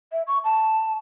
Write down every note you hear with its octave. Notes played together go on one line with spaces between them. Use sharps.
E5
C#6
A5